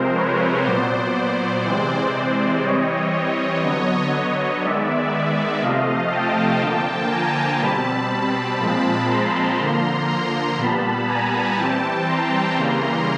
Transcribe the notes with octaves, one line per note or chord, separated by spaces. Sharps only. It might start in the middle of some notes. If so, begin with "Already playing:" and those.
Already playing: C3 F3 G#3 C4 A#4 C5
B4 C#5
A#2 F#3 B3 C5 D5
C3 E3 G#3 C4
E3 G3 C4 C#5 D#5
D3 F#3 B3
D#3 G#3 B3 D5 E5
C3 F3 A3 D#5 F5
G5 A5
D3 F3 A#3
G#5 A#5
B2 G3 C4 A5 B5
A#2 F3 G#3 C4
A#5 C6
D3 F3 A#3
A#5 C6
A#2 G3 B3 A5 B5
G#5 A#5
E3 G3 C4 G5 A5
A#5 C6
C#3 E3 G3 A#3